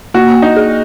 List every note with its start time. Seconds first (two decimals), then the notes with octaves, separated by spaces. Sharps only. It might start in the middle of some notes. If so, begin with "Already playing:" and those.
0.14 A#3 F#4
0.42 D#4
0.56 G#4